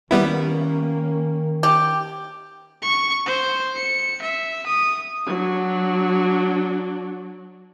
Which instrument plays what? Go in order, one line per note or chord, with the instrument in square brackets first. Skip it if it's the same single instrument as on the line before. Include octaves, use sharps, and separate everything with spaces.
[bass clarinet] D#3 [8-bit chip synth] G3 B3 E4 [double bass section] A#3 C#4
[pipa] G4
[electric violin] C#6
C5
C#7
E5
D#6
[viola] F#3 D4